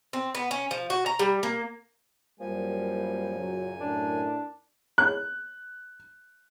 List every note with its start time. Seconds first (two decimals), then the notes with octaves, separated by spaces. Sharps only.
0.13 C4
0.35 B3
0.51 C#4
0.71 F3
0.90 F#4
1.06 A#5
1.19 G3
1.43 A#3
2.40 F#2 F3 G3 A#3 A#4 G#5
3.36 A#2 C#3 F#3
3.81 A2 D4 A#4
4.98 F#6